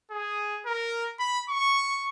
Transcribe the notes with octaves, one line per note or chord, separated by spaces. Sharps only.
G#4
A#4
B5
C#6